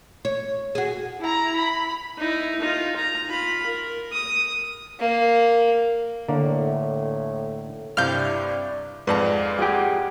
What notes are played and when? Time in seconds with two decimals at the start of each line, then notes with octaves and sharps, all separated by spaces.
0.25 C#5
0.75 F#4 G#4
1.20 E4 A#5
1.57 B5
2.18 D#4 E4
2.60 D#4 F4
2.96 A#5
3.27 F4 B5
3.66 A#4
4.12 D#6
5.00 A#3
6.29 A2 D3 A#3
7.97 G2 C3 D4 E4 F5 F6 G6
9.07 F2 G#2 F4 B4 D5 F5 A5
9.59 G4 G#4 F#5